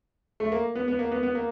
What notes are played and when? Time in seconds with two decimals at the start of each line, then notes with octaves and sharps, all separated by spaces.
0.40 A3
0.52 A#3
0.75 B3
0.88 B3
0.99 A#3
1.11 B3
1.23 B3
1.35 A#3